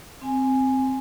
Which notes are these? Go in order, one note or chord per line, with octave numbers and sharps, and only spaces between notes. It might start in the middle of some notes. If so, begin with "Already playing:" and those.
C4 G#5